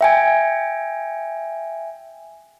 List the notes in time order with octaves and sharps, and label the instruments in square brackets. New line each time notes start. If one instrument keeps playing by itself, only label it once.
[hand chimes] E5 G5 G#5